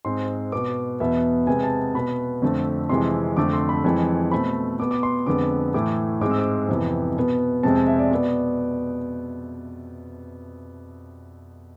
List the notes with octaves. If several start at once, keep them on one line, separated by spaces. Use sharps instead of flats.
G#2 G#3 C4 C6
B2 B3 D6
E2 B2 B3 E5
C3 G#3 B3 G#5
A5
B2 B3 B5
F2 D3 A3 C4
F2 C3 E3 G#3 C6
F2 D3 A3 C4 D6
C6
B5
F2 E3 G#3
B2 A3 C4 B5
B2 B3 D6
D6
C6
F2 D3 G#3 B3 D6
A2 E3 A3 D6
G#2 G#3 C4 D6
E6
D6
F2 C3 E3 B3
B2 B3
F2 C3 G#3 C4 A5
G#5
E5
D5
B2 B3 D5